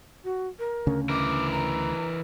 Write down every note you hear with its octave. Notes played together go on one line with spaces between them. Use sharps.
F#4
A#4
D2 C#3 C#4
E3 A#4 D6
A#5